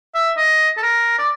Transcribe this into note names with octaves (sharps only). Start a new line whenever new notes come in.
E5
D#5
A4
A#4
D5